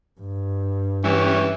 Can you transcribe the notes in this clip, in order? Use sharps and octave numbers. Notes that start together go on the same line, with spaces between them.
G2
E3 G3 C#4